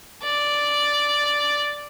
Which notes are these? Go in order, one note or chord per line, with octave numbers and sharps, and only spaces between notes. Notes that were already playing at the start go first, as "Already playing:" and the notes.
D5